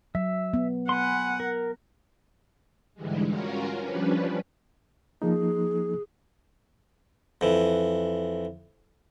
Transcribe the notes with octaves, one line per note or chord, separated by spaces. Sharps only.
F#3 E5
B3
F#5 G#5 B5 C6
A#4
G#2 D3 E3 G3 G#3
C#4 F4 F#4 A#4
F3 G3 C#4 D4 B4
F3 A#3 D#4 G#4
F2 E3